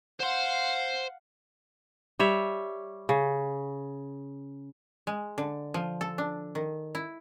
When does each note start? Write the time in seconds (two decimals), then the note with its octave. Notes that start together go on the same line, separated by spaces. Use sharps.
0.20 C5 F5 F#5 C6
2.19 G3 C#5 E5
3.09 C#3
5.07 G#3
5.38 D3
5.74 F3
6.01 A4
6.18 D4
6.55 D#3
6.95 E4